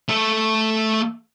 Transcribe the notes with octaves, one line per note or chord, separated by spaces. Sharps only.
A3 A4